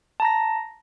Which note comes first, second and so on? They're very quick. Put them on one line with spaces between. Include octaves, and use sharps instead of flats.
A5 A#5 A#6